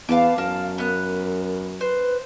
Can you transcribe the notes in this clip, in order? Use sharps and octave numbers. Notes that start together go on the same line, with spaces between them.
E2 B3 F5 A5 D6
F#2 A#4 F5 A5
B3 A#4 F#6
B4 C5